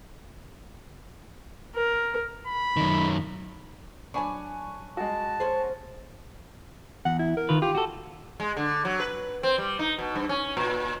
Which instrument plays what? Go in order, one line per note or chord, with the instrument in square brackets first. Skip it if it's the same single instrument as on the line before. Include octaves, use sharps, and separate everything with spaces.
[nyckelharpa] A#4
[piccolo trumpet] B5
[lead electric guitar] F#2 D#3
[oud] F#3 D4 [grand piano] G#5 B5 C#6
[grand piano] G#3 F#4 [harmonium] A5
[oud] C#4 G#4 C5
[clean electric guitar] E2 [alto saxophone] F#5
[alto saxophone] E4
A#4
[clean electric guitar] D#3 F4 B4
[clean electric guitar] F4 [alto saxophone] G4
[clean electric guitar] F#4 A4
[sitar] G#3
D3
F#3
B4
C4
G3
D#4
B2
G2
C#4
A#2